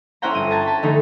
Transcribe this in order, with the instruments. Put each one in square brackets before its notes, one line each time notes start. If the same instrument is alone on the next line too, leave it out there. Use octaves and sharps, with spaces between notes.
[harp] C#4 E4 C5 F#5 G5 A#5
G1 D#7
A5 A#5 G#6 A6
A5 B5
D3 E3 A3 D#4